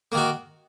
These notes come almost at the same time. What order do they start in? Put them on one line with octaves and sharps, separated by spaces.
A#3 D#3 F#4